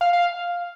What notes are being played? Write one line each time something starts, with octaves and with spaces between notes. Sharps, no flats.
F5
F5